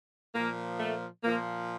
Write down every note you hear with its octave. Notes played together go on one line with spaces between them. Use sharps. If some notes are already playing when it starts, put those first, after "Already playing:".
A#2 F3 A#3
A3
A#2 F3 A#3